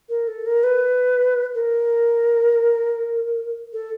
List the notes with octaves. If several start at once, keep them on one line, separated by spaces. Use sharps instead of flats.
A#4
A4
A#4
B4
A#4
A4